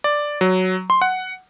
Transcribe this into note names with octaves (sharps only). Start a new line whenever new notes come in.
D5
F#3
C6
F#5